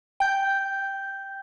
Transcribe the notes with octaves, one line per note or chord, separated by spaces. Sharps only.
G5 G6